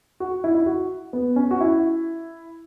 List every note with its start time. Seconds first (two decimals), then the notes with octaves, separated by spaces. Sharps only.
0.20 F#4
0.44 E4
0.55 E4
0.66 F#4
1.13 B3
1.36 C#4
1.51 F#4
1.61 E4